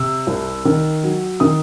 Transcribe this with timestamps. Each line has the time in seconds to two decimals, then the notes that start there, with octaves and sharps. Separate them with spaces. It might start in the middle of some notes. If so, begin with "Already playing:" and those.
Already playing: C3 E6
0.27 C2
0.65 D#3
1.03 F#3
1.40 D#3 D#6